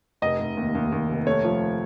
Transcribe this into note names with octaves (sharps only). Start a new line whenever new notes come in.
F1 D#5
F1
D#2
D#2
D#2
F1
A3 C#5
F3